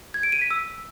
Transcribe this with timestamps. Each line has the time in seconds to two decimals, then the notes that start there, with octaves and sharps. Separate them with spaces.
0.14 G#6
0.23 D7
0.32 D#7
0.41 B6
0.51 E6